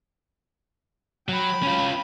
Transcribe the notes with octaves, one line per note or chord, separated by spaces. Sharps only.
F#3 G5 B5
C#4 F4